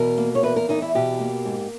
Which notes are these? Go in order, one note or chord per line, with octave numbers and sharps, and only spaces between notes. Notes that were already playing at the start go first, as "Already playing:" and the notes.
Already playing: E2 B2 A#4
A#3
C#5
E2 B4
A#4
E2 D#4
E4
B2 G4
A#3
G#2